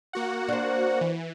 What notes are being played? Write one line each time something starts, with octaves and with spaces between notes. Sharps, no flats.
A#3 F#4 F#5
C4 D4
E3